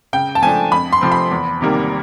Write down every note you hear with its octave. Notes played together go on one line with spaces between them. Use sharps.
C#3 G5
A5
F3 A3 D4 G#5
F2 B5
C6
C3 F3 A3 C4
B5
E2
C3 D#3 G3 A#3